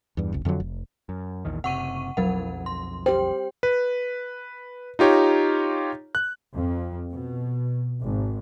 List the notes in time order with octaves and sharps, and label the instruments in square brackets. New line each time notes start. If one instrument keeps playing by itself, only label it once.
[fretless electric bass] E2 G2
F1 C#2
F2 D3 F3 F#3
F1
[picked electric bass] F#2
A#1 E2 D#3
[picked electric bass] F#1 C3 [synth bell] F#5 C#6 D#7
[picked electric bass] B1 F2 [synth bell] F#3 A#4 F#5
[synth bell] C6
[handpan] G4 C5 [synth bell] G5
[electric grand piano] B4
D#4 F4 G4 C#5 A#5
F#6
[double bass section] F2
B2
G#1